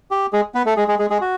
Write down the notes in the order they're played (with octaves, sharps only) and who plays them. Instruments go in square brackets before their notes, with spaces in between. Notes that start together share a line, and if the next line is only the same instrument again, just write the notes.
[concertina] G4
G#3 G#4
B3 B4
A3 A4
G#3 G#4
G#3 G#4
G#3 G#4
G#3 G#4
F#4